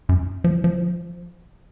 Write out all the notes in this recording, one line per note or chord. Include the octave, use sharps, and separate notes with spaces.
F#2
F3
F3